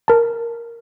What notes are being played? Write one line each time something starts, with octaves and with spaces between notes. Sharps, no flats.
A#4 A5